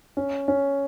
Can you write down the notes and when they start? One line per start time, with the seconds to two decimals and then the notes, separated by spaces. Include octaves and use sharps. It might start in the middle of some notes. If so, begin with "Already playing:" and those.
0.17 C#4
0.48 C#4